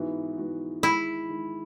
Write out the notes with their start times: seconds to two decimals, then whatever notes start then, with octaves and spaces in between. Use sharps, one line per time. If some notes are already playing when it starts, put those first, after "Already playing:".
Already playing: G#2 E3 B3 F#4
0.38 G#2 E3 B3 F#4
0.83 D#3 G#3 D#4 E4
1.28 D#3 G#3 D#4